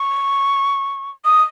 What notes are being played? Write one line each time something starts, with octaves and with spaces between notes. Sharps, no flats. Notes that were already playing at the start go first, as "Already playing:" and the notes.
Already playing: C#6
D#6